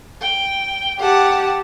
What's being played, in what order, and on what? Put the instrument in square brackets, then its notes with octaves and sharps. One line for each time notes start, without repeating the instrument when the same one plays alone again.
[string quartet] G5
[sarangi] G4 [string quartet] F#5 A5